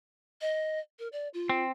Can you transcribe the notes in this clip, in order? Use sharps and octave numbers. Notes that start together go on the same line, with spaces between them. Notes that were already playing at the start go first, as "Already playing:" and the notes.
D#5
A#4
D5
F4
C4